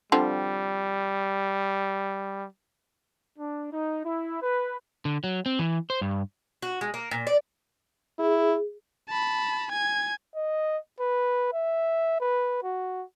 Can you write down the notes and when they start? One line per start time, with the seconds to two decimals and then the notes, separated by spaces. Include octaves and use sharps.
0.12 D3 F3 G3 C4
3.38 D4
3.72 D#4
4.04 E4
4.41 B4
5.05 D3
5.24 F#3
5.46 C4
5.59 E3
5.90 C5
6.01 G2
6.62 F#4
6.81 G#3
6.94 A#3
7.11 A#2
7.27 D5
8.19 E4 G#4
9.09 A5 B5
9.72 G#5 G#6
10.36 D#5
11.00 B4
11.53 E5
12.21 B4
12.63 F#4